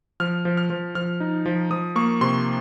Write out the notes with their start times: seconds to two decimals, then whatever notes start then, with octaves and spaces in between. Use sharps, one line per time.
0.20 F3 F6
0.45 F3
0.57 F6
0.70 F3
0.95 F3 F6
1.20 D#4
1.46 F3
1.70 F3 D#6
1.96 A#3 C#6
2.21 C3 C6